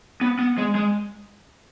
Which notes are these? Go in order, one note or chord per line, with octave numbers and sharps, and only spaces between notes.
B3
B3
G#3
G#3